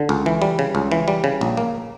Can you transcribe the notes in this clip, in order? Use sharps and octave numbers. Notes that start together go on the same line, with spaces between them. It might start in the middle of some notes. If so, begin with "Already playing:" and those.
Already playing: D3
C#2
E3
G3
C#3
C#2
E3
G3
C#3
A#1
A#3